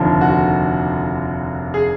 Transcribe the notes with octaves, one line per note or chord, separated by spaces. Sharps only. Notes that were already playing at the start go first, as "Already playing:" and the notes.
Already playing: F1 D#2 D3 F3
F#4
G#4